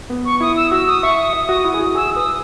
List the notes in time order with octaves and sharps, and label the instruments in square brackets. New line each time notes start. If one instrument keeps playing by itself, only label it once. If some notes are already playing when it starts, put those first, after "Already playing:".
[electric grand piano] B3
[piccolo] C#6
[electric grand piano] E4 [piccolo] D#6
[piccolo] E6
[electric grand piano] F#4 [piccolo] E6
[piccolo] D#6
[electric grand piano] E5 [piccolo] C#6
[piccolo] D#6
[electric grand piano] E5
F#4
E4
G#4
F#4
[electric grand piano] G#4 [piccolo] E6
[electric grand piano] B4 [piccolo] D#6